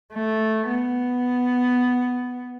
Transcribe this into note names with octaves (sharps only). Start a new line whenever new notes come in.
A3
B3